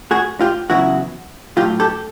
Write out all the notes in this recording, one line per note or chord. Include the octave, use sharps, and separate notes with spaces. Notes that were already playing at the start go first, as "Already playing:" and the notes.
F#4 G#4
F4 G4
E2 C#3 F#3 E4 F#4
A2 F#3 F4 G4
G4 A4